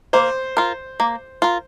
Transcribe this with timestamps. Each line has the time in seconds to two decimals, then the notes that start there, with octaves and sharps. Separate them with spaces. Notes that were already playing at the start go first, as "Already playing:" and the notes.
0.13 A#3 C5
0.57 F4 A#4
1.00 A#3
1.42 F4 A#4